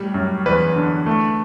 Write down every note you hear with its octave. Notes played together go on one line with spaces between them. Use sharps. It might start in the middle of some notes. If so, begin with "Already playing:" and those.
Already playing: A2 G3
F#2
E2 B4
D3
A3